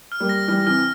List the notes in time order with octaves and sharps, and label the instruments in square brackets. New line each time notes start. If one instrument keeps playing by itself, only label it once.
[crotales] F6
[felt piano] G3 A#3
[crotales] A#6
[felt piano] E3 G3 [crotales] F6
[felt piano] C3 E3 [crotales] F6